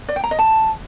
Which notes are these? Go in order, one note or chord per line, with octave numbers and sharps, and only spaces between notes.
D5
G5
A#5
D#5
A5